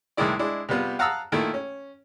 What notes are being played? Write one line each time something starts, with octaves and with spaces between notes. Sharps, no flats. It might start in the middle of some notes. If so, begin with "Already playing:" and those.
C2 A2 D#3 G#3 E4 D5
G#3 D4 E4
C3 G3 B3 F4
F5 F#5 A5 A#5 D#6 E6
A#2 D#3 A3 E4
C#4